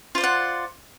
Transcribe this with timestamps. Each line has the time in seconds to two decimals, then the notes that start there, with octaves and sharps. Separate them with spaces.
0.15 F4
0.18 C5
0.21 D5
0.24 F#5